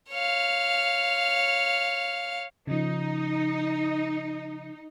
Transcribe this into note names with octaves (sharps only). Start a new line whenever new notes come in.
C#5 F5
C#3 F3 D#4